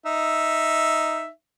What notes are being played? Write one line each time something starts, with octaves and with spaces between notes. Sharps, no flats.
D#4 E5